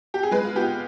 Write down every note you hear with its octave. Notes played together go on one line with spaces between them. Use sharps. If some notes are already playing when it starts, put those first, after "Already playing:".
G4
G#4
G#3 B4
F4
B3 G4